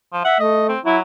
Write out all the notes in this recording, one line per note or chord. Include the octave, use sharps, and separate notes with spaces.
F3
E5 F#5
A3 D#5
C4
F#3 E4